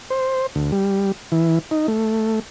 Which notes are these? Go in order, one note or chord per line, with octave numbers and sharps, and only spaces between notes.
C5
D2
G3
E3
D#4
A3